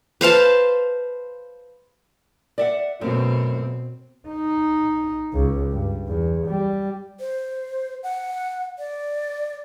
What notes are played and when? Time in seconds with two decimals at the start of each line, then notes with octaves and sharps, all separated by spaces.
0.21 B4 C5 F5 A5
2.58 D5 E5 F#5
3.01 F#2 B2 A3 C4
4.28 D#4
5.33 C#2
5.72 G2
6.07 E2
6.47 G3
7.20 C5
8.03 F#5
8.78 D5